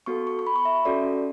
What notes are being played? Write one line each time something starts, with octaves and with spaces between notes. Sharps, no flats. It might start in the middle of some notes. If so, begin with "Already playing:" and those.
B3 F#4 A4 C#6
C#6
C#6
B5
C#6
E5
C#4 F#4 A4 D5